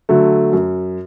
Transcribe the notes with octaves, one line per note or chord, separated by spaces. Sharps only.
D3 F#3 A3
F#2